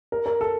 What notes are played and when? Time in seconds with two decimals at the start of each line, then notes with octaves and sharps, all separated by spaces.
0.12 A#4
0.26 A#4
0.41 A4